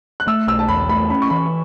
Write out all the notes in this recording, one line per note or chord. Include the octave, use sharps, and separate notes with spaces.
F#6
A3 E6
B1 E6
A5
E2 B5
A3 B5
C#4 B5
C#6
E3 B5